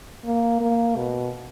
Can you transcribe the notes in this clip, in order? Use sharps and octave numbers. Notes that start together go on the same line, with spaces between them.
A#3
A#3
B2